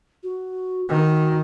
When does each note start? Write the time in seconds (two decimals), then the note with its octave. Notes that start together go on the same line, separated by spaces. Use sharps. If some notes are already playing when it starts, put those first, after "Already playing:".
0.23 F#4
0.89 D#3 F#4